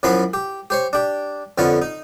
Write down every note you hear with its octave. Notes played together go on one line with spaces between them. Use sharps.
F#2 E3 F3 B3 B5 C6
G4
G4 C5 C#5
D4 G4
F2 D3 B3 F4 C#5
D#4